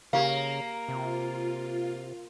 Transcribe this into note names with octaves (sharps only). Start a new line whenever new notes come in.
C#3 A#3 G4 F5 A#5
C3 F4